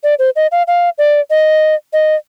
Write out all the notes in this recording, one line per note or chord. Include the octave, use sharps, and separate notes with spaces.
D5
C5
D#5
F5
F5
D5
D#5
D#5